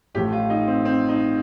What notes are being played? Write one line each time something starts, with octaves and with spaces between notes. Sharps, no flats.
A1 A2 F3 G4
F4
D#4
C4
C4
D#4